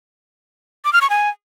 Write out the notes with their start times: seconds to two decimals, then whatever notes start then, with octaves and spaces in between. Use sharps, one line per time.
0.85 D6
0.93 F6
1.01 C#6
1.10 G#5